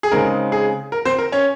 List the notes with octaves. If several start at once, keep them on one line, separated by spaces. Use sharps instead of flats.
G#4
C#3 G#3 C4 D#4 A#4
G#4
A#4
C4 C5
A#4
C#4 C#5